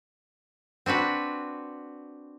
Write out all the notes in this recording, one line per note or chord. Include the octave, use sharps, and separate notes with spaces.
C4 D4 F#4 B4